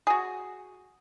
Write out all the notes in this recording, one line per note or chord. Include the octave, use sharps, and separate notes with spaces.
F#4 G#4